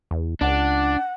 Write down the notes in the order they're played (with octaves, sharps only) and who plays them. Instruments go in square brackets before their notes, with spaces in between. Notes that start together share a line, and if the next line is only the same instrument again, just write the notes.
[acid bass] E2
[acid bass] C#2 [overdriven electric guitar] D4 [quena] F#5